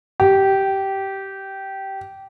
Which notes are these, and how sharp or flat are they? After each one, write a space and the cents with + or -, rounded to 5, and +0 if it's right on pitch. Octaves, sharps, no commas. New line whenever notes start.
G4 -15